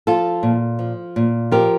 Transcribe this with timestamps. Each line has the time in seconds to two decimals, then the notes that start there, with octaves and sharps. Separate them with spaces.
0.07 F3 F4 A4
0.43 A#2
0.79 F3
1.16 A#2
1.52 F3 G4 A#4